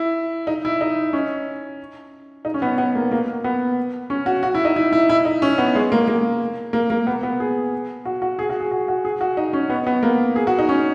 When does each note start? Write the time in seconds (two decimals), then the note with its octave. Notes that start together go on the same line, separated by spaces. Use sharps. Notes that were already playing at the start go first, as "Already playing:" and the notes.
Already playing: E4
0.47 D#4
0.65 E4
0.81 D#4
1.13 C#4
2.45 D#4
2.54 C#4
2.62 B3
2.78 B3
2.95 A#3
3.12 A#3
3.44 B3
4.10 C#4
4.26 F#4
4.43 F#4
4.55 E4
4.65 D#4
4.76 E4
4.93 E4
5.10 E4
5.25 D#4
5.42 C#4
5.58 B3
5.75 G#3
5.92 A#3
6.08 A#3
6.73 A#3
6.90 A#3
7.07 B3
7.23 B3
7.40 G#4
8.05 F#4
8.22 F#4
8.39 G#4
8.50 F#4
8.60 G#4
8.71 F#4
8.88 F#4
9.05 G#4
9.21 F#4
9.37 D#4
9.53 C#4
9.70 B3
9.87 B3
10.03 A#3
10.36 G#4
10.47 F#4
10.59 D#4
10.69 C#4